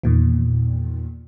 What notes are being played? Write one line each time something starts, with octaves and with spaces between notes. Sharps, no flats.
E2 A#2 D#3